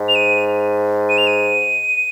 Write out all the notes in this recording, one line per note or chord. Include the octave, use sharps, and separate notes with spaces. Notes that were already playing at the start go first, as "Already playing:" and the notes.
Already playing: G#2
F7
D#7
D#7
F7
D#7